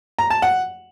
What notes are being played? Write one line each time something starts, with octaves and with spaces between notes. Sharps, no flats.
A#5
A5
F#5